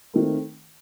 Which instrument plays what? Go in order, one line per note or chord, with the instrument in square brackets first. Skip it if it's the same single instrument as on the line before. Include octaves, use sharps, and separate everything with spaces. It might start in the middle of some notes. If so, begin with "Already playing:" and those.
[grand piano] D#3 A3 C4